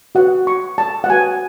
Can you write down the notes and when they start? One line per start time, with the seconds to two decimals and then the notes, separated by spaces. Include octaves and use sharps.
0.15 F#4 B4 F#5
0.47 C#6
0.78 A5
1.04 F#5
1.09 F#4 B4 G#5